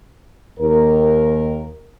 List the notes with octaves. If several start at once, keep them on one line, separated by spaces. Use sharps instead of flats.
D#2 A#4